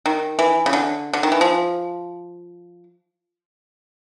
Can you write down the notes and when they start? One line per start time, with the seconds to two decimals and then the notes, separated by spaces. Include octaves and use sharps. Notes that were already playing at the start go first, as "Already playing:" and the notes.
0.06 D#3
0.39 E3
0.66 C#3
0.73 D3
1.13 D3
1.23 D#3
1.32 E3
1.41 F3